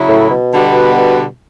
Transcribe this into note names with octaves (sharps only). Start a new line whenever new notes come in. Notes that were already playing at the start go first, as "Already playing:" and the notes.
Already playing: C#3 F#3 C#4 E4
A2
B2
D3 G3 B3 F#4 B4